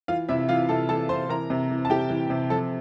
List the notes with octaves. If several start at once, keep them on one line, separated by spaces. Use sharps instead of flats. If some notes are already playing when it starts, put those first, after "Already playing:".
E3 F4 F5
C3 E4 E5
E3 F4 F5
C3 A4 A5
E3 A4 A5
C3 C5 C6
E3 A#4 A#5
C3
E3
A5
C3 G4 G5
E3
C3
F3 A4 A5